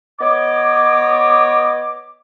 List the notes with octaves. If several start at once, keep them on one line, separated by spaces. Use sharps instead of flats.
B3 C#5 D#5 D6